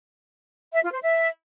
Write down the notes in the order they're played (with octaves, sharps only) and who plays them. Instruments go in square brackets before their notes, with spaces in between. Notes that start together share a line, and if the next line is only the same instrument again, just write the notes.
[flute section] E5
F4
C5
E5